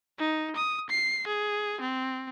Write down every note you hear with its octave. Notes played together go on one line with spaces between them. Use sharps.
D#4
D#6
C7
G#4
C4